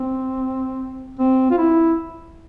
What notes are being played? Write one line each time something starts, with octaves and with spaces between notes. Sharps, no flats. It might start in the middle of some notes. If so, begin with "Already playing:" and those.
Already playing: C4
C4
F4
E4